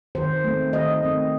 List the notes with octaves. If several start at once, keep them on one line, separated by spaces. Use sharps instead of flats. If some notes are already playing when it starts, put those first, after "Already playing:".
D#3 C5
A3 C4
D#3 D#5
A3 C4